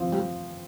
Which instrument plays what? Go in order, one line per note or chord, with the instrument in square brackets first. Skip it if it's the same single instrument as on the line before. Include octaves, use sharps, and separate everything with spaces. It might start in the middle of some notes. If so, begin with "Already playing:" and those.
Already playing: [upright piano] F3 C4
[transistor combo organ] G3